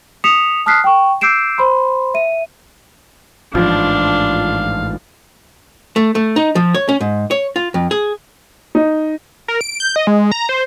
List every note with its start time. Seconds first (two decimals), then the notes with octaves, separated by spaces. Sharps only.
0.24 D#6 B6 C#7 E7 F7
0.66 A5 D#6 F6 F#6 B6 C7
0.84 G5 C#6
1.21 D6 E6 G6 C7 D7 E7
1.58 C5 B5 C6
2.14 E5 D#7
3.55 A1 G#2 F3 D4 F5
5.96 A3
6.15 A3
6.36 D#4
6.55 F3
6.74 C#5
6.89 C#4
7.01 G#2
7.31 C#5
7.56 F4
7.74 F2
7.91 G#4
8.75 D#4
9.48 A#4
9.61 D7
9.80 G6
9.96 D#5
10.07 G#3
10.32 A#5
10.49 C5